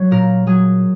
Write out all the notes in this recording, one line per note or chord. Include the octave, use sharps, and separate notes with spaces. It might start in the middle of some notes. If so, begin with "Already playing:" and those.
Already playing: F#3 C#5
A#2 A#4
F#3 G#4